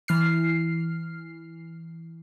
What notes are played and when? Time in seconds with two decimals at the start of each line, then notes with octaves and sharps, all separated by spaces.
0.08 E3 F6 C7